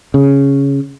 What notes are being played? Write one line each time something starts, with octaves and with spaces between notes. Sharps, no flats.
C#3